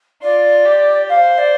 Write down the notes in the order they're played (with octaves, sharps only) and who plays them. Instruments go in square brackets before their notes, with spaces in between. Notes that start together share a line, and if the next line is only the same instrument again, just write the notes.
[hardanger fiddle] F4 [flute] D5
[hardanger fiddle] G4
[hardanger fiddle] C5 [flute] F5
[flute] D5